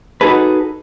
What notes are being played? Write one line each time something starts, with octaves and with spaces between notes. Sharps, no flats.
D#4 F#4 G#4 A4 B4